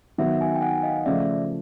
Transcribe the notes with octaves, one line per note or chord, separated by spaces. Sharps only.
D#3 F#3 B3 E5 F#5
F#5 G#5
G5
F#5 G#5
F#5
D#5 F5
C#3 F3 A3 D5 E5